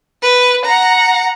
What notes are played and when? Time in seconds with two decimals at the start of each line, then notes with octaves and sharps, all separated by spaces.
0.22 B4
0.65 F#5 A#5